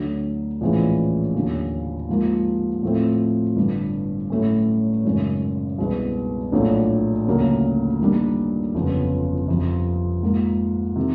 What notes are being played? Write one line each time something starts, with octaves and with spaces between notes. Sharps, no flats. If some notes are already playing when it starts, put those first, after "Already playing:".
Already playing: D2 D3 F#3
A#1 A2 E3 G#3 C#4
D#2 D3 F#3
G#2 F3 A#3
A2 F3 A3 C4
G1 G2 D3
A2 F#3 A3 C#4
G#1 F#2 C#3
C2 B2 G#3 B3
A#1 A2 F#3 A3 D4
D2 C#3 F#3 A#3
G2 D#3 G3 A#3 D4
G1 F2 C#3 F#3 B3
F2 C3 F3
G#2 F3 A#3
C3 D#3